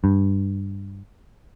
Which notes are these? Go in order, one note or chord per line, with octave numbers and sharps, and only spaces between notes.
G2